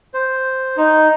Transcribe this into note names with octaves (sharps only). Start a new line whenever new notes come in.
C5
D#4